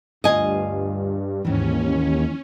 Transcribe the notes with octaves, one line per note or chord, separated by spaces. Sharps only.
D2 G2 F4 D#5 F5 G#5
D#2 G#2 D#3 E3 C#4